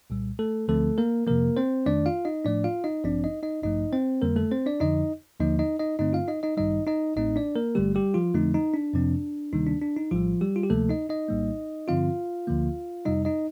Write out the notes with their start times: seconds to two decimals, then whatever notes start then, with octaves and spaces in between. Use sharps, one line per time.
0.10 C2 A#2 G3
0.39 A3 A4
0.68 D2 D3 F3 A3 C4 A4
0.98 A#3 A#4
1.27 F2 C3 F3 A#3 A#4
1.57 C4 C5
1.86 F2 D#3 A3 D4 D5
2.06 F4 F5
2.25 D#4 D#5
2.45 A2 F3 A3 D4 D5
2.64 F4 F5
2.84 D#4 D#5
3.04 A1 G2 F3 C4 D4 D5
3.24 D#4 D#5
3.43 D#4 D#5
3.62 A1 G2 F3 A3 D#4 D#5
3.93 C4 C5
4.22 F2 D3 G3 A#3 A#4
4.36 A3 A4
4.51 C4 C5
4.66 D4 D5
4.80 F2 D3 F3 D#4 D#5
5.40 D#2 D3 F3 A#3 D#4 D#5
5.59 D#4 D#5
5.79 D#4 D#5
5.99 G2 D3 A3 C4 D#4 D#5
6.13 F4 F5
6.28 D#4 D#5
6.43 D#4 D#5
6.57 A1 G2 D#3 G3 D#4 D#5
6.87 D#4 D#5
7.16 A1 A2 A3 C4 D#4 D#5
7.36 D4 D5
7.56 A#3 A#4
7.75 G1 G2 D3 G3 A3 G4
7.95 G3 G4
8.14 F3 F4
8.34 F2 D3 F3 A3 C4 D#4
8.54 D#4
8.74 D4
8.93 F2 C3 F3 C4
9.53 D2 C3 D#3 G3 A#3 D#4
9.67 D4
9.82 D4
9.96 D#4
10.11 A#1 A2 F3 G3 F4
10.41 G3 G4
10.56 F4
10.63 G4
10.70 D2 C3 F3 A3 A#3 A4
10.89 D#4 D#5
11.09 D#4 D#5
11.29 A#1 A2 G3 A#3
11.88 G2 D3 F3 C4 F4 F5
12.47 D2 D3 F3 A#3
13.05 F2 C3 G3 D#4 D#5
13.25 D#4 D#5